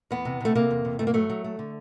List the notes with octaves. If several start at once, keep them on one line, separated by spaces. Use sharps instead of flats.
E2 B3
C3
C3 A3
C3 A#3
E2
C3
G2 A3
A#3
F#3 A3
F#3
A3
D3